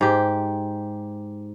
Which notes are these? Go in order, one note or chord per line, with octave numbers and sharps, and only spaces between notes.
G#2 G4